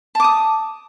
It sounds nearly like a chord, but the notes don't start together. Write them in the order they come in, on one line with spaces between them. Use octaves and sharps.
A5 D6 D#6